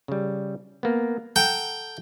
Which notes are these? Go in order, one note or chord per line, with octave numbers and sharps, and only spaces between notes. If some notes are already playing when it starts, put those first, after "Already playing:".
C#3 G3
A#3 B3
A4 F#5 G5 A#5